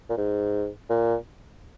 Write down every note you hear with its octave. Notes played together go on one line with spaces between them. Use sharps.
A#2
G#2
A#2